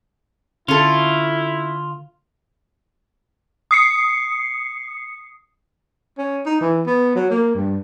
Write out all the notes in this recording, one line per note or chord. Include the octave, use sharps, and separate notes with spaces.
D3 C#4 E4 F4 A4
D#6 C7 C#7
C#4
D#4
E3
B3
F#3
A#3
G2